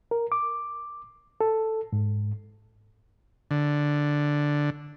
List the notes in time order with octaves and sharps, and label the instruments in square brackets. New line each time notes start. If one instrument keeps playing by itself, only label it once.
[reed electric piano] A#4
D6
A4
G#2
[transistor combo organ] D3